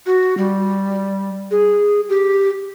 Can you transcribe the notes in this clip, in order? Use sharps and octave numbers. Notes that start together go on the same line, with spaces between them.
F#4
G3
G#4
G4